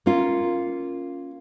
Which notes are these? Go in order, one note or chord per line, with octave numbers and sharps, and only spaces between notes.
A#3 C#4 F4